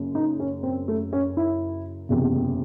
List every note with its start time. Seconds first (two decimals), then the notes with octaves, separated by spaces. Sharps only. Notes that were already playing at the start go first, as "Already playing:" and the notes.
Already playing: F#1 F#2 C#3
0.15 D#4
0.40 C#4
0.63 C4
0.88 A3
1.13 C#4
1.37 E4
2.09 F#1 E2 C3